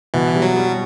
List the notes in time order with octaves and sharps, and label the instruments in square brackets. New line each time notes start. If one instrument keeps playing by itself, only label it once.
[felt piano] B2 [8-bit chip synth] E3
[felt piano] G3
[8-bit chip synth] F#3
[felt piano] G3